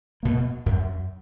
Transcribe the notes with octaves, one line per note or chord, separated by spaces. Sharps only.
B2 A#3
F#2